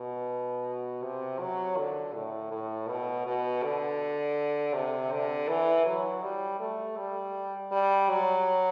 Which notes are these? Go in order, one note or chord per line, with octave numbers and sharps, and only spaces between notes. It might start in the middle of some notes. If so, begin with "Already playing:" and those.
Already playing: B2
C3
F#3
D3
A2
A2
B2
B2
D3
C3
D3
E3
F#3
G3
A3
G3
G3
F#3